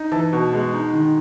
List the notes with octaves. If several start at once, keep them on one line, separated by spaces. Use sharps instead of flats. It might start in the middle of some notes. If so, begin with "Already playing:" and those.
Already playing: D#4
E3 A5
B2
G#3
D#4
D#3